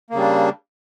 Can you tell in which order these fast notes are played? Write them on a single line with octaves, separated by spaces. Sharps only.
A#3 C#3 G3 D4